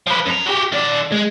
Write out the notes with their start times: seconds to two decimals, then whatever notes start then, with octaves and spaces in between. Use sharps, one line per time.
0.07 F3 B4
0.26 F#2 A#5
0.46 F#4 G4
0.72 D#3 D5
1.12 G#3